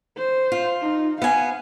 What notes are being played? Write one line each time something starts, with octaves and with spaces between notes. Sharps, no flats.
C5
F4
D#4
B3 F5 G#5